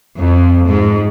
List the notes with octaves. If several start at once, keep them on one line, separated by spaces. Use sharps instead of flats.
F2
G#2